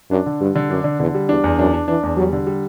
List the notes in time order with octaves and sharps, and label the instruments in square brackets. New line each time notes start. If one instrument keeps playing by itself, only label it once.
[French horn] F#2 [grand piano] D4
[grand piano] D3
[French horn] G2 [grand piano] G3
[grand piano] D3
[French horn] F#2 [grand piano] D4
[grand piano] D3
[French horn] E2 [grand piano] D3
[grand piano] G3
[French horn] E2 [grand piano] D4
[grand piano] E2
[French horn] F#2 [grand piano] D4
[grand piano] D4
[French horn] E3 [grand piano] D4
[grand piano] E2
[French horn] F#3 [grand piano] G3
[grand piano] D3
G3